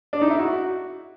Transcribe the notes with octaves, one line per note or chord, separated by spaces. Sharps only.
D4
D#4
E4
F#4